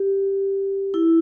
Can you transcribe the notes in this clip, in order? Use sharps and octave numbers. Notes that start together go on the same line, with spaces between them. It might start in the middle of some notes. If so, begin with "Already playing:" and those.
Already playing: G4
E4